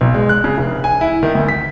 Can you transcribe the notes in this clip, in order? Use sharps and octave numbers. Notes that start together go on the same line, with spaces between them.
B1
G#3
F#6
C#3
F1
G#5
E4
D#3
D2
B6